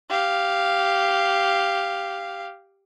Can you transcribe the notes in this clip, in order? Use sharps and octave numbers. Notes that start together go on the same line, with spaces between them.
G4 F5